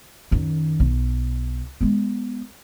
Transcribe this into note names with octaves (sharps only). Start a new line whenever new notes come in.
F#2 D#3
B1
G#3 B3